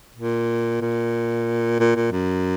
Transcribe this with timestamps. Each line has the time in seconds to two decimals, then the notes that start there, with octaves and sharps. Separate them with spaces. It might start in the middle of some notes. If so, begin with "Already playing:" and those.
0.16 A#2
0.81 A#2
1.80 A#2
1.96 A#2
2.12 F#2